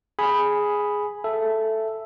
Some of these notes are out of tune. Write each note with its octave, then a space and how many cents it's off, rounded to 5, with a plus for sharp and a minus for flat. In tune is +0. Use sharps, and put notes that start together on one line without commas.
G#4 +0 G#5 +0 B5 +0
A4 +0 E5 +10